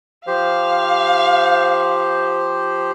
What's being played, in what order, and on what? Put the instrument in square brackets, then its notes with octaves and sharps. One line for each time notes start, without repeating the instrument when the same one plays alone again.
[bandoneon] F3 G4 C5 [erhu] F5